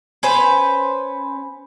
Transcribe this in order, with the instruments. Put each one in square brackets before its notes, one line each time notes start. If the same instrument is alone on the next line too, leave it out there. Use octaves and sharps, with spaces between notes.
[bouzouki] C#4 B4 C5